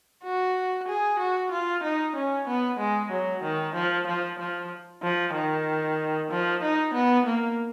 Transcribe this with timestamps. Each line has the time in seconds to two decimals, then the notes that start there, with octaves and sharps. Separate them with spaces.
0.24 F#4
0.88 G#4
1.19 F#4
1.51 F4
1.83 D#4
2.16 C#4
2.48 B3
2.79 G#3
3.11 F#3
3.43 D#3
3.75 F3
4.07 F3
4.39 F3
5.03 F3
5.34 D#3
6.31 F3
6.62 D#4
6.94 B3
7.26 A#3